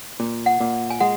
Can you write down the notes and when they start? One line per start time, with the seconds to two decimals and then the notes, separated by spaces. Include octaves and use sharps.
0.20 A#2
0.46 F#5
0.60 A#2
0.90 G#5
1.00 G#3 F#5